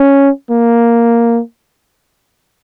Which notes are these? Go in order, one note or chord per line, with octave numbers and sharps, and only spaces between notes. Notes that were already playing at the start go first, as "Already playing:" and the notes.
Already playing: C#4
A#3